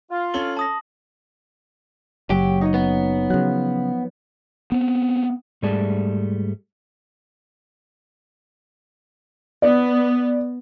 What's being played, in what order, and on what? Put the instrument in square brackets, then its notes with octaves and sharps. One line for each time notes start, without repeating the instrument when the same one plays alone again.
[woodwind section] F4
[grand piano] C#4 A4 G7 [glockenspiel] F#7
[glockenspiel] A5 D#6 A#6
[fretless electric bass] F#1 [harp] F#3 [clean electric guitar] G4
[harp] D#4 C#5 D#5
[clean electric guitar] B3
[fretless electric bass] C#3 F#3 [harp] F3 F#6
[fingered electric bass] B3 C4
[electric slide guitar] G#2 G3 A3 G#4 D5 A5
[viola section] B3 [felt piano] D5